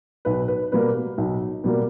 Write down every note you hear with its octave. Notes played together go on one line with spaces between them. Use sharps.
B1 B4
B4
B2 G3 A#3 B4
B1
B2 G3 A#3